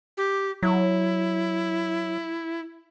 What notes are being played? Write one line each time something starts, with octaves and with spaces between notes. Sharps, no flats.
G4
F#3 E4